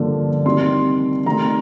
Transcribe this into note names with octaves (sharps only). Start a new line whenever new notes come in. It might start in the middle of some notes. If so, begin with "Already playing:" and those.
Already playing: G2 D3 F3 A#3
C3 D#3 G3 C6
C3 D#3 A3 A#5